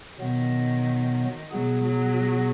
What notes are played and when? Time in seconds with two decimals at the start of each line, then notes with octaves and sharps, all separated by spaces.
0.18 B2 D#3 F#3 B3
1.51 B2 F#3 B3 G#4
1.84 F#3